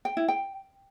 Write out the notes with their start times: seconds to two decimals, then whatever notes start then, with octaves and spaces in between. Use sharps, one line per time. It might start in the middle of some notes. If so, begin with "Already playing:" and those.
0.05 G5
0.17 E4
0.28 G5